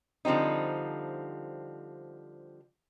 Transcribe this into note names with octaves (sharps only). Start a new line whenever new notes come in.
D3 F3 G3 C4 D#4